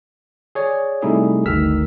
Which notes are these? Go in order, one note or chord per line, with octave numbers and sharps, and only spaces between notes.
G#4 C#5 D5
C3 G3 A3 D#4 E4 G#4
G1 D2 D#3 E6 F6 B6